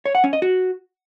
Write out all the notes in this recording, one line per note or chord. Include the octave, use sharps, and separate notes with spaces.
C#5
F#5
C#4
D#5
F#4